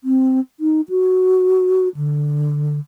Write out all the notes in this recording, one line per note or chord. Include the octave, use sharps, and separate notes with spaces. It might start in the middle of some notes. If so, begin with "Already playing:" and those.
C4
D#4
F#4
D3